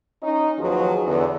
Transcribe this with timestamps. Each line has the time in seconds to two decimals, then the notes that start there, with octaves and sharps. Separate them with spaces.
0.23 C#4 D#4
0.59 D#2 F3 F#3 F#4 G#4 B4
1.06 E2 D3